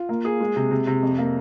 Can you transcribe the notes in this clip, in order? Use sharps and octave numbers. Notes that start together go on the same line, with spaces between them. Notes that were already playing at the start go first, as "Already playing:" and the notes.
Already playing: F4
A#3
G#4
G#3
C3
C3
C3
F2
A#3